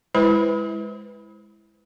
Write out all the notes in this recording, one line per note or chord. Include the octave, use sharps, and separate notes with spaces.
G#3 E4 B4 C5 B5